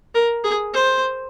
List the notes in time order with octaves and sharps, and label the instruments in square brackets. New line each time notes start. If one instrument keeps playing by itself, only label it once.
[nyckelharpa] A#4
G#4
C5